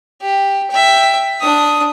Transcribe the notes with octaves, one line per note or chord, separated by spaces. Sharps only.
G4
E5 G5
D4 D#6